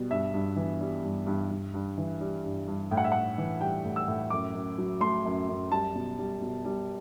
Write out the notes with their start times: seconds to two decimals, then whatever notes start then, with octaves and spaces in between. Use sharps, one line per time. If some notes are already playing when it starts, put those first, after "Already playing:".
Already playing: B2 G3
0.10 G2 E5
0.34 G2
0.56 E3
0.80 G3
1.03 G2
1.27 G2
1.50 G2
1.74 G2
1.98 E3
2.21 G3
2.45 G2
2.68 G2
2.91 A2 G5
2.97 F#5
3.04 E5
3.12 A2 F#5
3.38 E3
3.61 G3 G5
3.85 A2
3.96 E6
4.08 A2
4.30 F#2 D6
4.55 F#2
4.78 F#3
5.00 A3 C6
5.25 F#2
5.48 F#2
5.71 G3 A5
5.94 B2
6.19 G3
6.41 B2
6.65 G3